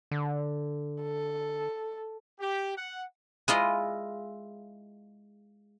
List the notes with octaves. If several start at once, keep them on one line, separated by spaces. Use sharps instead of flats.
D3
A4
G4
F#5
G#3 E4 F4 D#5